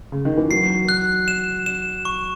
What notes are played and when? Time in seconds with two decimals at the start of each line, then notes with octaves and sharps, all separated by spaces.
0.12 C#3
0.25 D#3
0.37 E3
0.50 F#3 C7
0.89 F#6
1.28 E7
1.66 E7
2.05 C#6